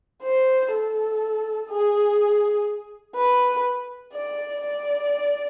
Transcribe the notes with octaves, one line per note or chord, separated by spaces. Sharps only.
C5
A4
G#4
B4
D5
D5